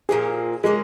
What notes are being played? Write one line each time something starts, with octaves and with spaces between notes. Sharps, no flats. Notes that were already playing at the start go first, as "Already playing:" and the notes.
A#2 F3 A#3 G#4
C#3 G#3 A#3 D#4 G#4